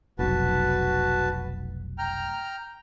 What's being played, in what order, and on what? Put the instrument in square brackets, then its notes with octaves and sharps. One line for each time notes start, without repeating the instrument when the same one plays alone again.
[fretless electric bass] F1 B1 [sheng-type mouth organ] F#4 B4 A5
[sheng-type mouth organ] G5 A#5 F6